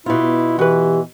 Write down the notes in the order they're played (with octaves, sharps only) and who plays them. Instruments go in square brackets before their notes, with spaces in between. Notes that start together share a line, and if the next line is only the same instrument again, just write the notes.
[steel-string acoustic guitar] B2 F4 [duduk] E4
[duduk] E3 [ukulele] F#4 B4 [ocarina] G4